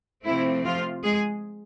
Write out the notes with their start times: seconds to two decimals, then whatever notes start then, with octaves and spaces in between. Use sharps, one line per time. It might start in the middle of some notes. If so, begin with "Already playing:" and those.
0.25 C3 F3 A3 C4 E4
0.64 F3 F4
1.04 G#3 G#4